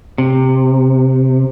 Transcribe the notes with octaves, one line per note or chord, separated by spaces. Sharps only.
C3